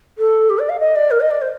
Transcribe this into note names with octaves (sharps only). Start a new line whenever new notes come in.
A4
G4
D5
F5
D#5
D5
A#4
D#5
D5
C5